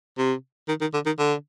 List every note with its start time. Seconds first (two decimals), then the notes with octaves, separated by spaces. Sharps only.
0.18 C3
0.68 D#3
0.81 D#3
0.94 D3
1.06 D#3
1.19 D3